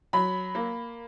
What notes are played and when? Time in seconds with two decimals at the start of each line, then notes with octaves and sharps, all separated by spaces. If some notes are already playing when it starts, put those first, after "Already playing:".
0.13 F#3 B5
0.55 A#3